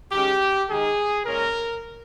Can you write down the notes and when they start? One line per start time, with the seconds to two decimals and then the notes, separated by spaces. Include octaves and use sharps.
0.12 D#3 G#3 C#4 G4
0.69 D#3 G#3 D#4 G#4
1.26 A#2 G#3 C#4 A#4